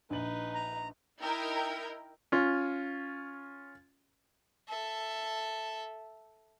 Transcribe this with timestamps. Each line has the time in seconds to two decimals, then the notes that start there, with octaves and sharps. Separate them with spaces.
0.10 A#1 D#4 B4 F#7
0.54 A#5
1.21 D#4 E4 A#4 G5
2.32 C#4 F4
4.69 A4 E5